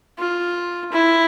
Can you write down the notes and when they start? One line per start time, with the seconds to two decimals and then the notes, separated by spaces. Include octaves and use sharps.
0.18 F4
0.92 E4